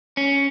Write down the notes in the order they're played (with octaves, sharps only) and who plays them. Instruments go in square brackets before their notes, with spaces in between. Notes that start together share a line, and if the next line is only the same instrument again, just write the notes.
[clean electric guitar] C#4